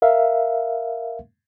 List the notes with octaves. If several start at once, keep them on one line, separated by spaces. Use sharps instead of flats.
A#4 E5 F5